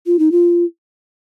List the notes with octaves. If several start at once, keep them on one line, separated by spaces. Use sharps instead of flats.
F4
D#4
F4